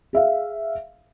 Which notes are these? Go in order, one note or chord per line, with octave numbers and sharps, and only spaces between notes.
G#4 E5 F5